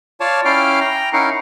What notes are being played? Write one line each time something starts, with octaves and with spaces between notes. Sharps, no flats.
F4 C#5 D5 A5
C#4 E4 F5 G5 D6 F6
G5 A#5
C#4 D#4 E4 A#4 F5 F#5